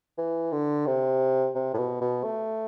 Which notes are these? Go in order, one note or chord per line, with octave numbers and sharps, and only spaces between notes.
E3
D3
C3
C3
A2
B2
B2
A3